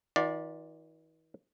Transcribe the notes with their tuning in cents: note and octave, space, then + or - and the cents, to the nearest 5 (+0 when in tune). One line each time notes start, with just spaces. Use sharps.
E3 -45 F4 +45 D5 +0